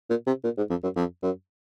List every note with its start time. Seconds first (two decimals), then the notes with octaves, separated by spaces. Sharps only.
0.10 A#2
0.27 C3
0.44 A#2
0.58 G#2
0.70 F2
0.83 F#2
0.96 F2
1.22 F#2